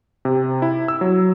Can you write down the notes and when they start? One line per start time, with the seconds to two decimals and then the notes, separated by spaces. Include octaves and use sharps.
0.25 C3
0.62 E4
0.88 E6
1.01 F#3